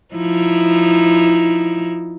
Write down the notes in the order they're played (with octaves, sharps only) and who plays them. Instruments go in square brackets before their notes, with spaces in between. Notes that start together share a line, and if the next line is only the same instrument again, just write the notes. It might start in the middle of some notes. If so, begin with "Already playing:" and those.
[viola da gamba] F3 D#4 E4